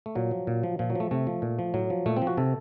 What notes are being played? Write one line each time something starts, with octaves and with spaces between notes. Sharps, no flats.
A3
A#2 F#3
F3
A#2
F3
A#2 F3
F#3
F3 A3
C3 A3
F3
A#2
F3
A2 F#3
F3
A#2 A3
C4
F3
F#4
C3 A4